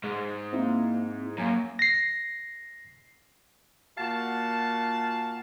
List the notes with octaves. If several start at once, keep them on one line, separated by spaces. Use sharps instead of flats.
G#2 G#3
A#3 C4 E4
F#2 A#3 G#5 A#5
A#6 C7
A#2 F#4 F5 A5